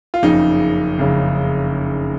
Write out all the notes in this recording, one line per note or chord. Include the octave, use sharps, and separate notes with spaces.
F4
F#1 F2 C#3 D#4
F#1 F2 C#3